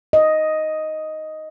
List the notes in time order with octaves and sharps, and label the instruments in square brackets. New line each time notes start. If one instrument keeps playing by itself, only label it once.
[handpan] D#5